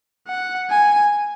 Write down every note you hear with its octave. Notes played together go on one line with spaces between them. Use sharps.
F#5
G#5